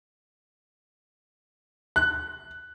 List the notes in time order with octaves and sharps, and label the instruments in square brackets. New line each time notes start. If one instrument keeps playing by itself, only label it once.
[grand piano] F#6